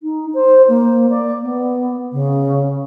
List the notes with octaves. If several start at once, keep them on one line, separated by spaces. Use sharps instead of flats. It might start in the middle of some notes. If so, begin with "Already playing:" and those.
D#4
C5
A#3
D5
B3
C#3